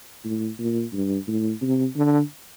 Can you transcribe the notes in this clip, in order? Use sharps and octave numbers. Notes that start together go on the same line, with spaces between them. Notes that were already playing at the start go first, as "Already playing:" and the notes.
A2
A#2
G2
A2
C3
D3